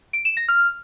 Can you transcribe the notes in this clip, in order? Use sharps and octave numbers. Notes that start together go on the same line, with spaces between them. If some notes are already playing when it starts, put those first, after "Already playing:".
D7
E7
A#6
F6